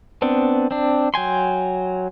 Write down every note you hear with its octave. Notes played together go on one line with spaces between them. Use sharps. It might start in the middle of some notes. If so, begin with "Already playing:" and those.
B3 C4 D4
C4 D4
F#3 G5 G#5 C6